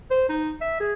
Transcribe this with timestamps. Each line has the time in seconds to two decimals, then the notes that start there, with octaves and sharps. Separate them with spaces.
0.11 C5
0.29 D#4
0.61 E5
0.80 G#4